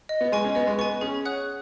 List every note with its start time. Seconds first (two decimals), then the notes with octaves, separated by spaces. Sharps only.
0.09 D#5
0.21 B3
0.32 G#3 G#5 C#6
0.45 C#4
0.55 B3 D#5
0.67 G#3
0.78 B3 G#5 C#6
1.01 C#4 G#4
1.25 C#5 F#5 D#6 F#6